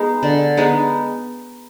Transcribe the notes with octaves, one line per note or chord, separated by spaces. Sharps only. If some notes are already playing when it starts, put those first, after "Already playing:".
Already playing: G#3 B3 D#4
D3
G#3 B3 D#4